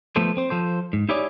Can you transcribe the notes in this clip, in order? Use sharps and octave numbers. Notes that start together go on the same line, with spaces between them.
F3 A3 B3 A4 C5
C4 C5
F3 A4 C5
G#2
D#4 E4 G4 G#4 C#5 D5